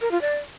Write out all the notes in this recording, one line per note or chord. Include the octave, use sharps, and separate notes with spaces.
A#4
F4
D5